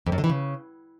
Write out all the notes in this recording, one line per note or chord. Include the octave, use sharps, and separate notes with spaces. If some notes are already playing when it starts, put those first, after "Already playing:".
F2
F#2
D3
E3
C#3